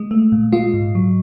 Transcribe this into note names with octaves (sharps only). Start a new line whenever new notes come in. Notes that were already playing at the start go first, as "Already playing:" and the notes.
Already playing: G#3
A3
A#2
G#3 F4
G#2
F#3